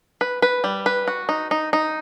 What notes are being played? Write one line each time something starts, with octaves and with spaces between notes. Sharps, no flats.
B4
B4
G3
B4
F#4
D#4
D#4
D#4